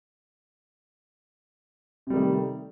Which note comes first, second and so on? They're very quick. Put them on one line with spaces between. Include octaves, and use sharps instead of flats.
C3 G3 D#3 A3